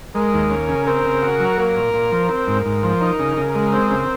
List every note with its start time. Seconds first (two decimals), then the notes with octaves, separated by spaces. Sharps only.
0.15 G#3 A#4
0.33 D#2
0.50 C#4
0.68 C#3
0.86 C4 A#4
1.04 C#3
1.22 F#4
1.40 F#3
1.58 A#3 A#4
1.76 A#2
1.94 A#2
2.12 F3
2.29 C4 A#4
2.47 G#2
2.65 G#2
2.83 F3
3.01 D#4
3.19 C#3
3.37 C#3
3.55 G#3
3.72 C4
3.90 C#3